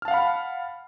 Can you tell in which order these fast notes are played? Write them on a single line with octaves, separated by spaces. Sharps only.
F6 A5 F5 F#5 B5